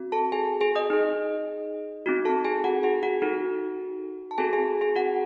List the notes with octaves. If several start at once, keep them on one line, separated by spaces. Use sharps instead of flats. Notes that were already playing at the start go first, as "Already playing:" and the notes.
Already playing: C4 F#4
A4 A5
G#4 G#5
G#4 G#5
D#5 D#6
D#4 G#4
C4 D#4 F#4
A4 A5
G#4 G#5
F#4 F#5
G#4 G#5
F#4 F#5
D#4 F#4 A4
A5
C4 F#4 G#4 A4 G#5
G#4 G#5
G#4 G#5
F#4 F#5